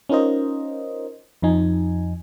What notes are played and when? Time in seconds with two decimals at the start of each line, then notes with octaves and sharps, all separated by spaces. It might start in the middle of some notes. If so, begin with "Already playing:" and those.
0.09 C#4 D#4 F4 A#4 C5 D#5
1.42 F2 F3 D#4 G#5